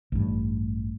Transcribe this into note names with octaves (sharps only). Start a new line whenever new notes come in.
A1 G2